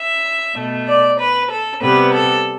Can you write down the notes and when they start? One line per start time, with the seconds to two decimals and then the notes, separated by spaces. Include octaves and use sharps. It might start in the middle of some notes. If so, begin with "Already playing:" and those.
Already playing: E5
0.56 B2 A3
0.88 D5
1.19 B4
1.51 A4
1.82 C3 G3 B3 B4
2.14 A4